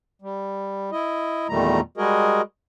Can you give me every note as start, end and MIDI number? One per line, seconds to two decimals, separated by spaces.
0.22 0.90 55
0.92 1.47 64
0.92 1.47 75
1.49 1.80 40
1.49 1.80 46
1.49 1.80 51
1.49 1.80 55
1.49 1.80 57
1.49 1.80 82
1.97 2.42 55
1.97 2.42 56
1.97 2.42 66
1.97 2.42 68
1.97 2.42 70
1.97 2.42 75